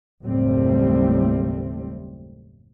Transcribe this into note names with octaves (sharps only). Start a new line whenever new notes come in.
F#1 D#2 A2 G3 A3 C4